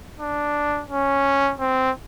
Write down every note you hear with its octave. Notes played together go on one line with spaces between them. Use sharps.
D4
C#4
C4